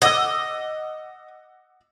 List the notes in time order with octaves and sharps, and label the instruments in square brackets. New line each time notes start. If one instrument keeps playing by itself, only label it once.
[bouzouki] D#5 [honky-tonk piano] F#5 D6 E6